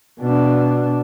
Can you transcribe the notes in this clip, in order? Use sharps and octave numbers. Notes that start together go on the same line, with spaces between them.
B2 D4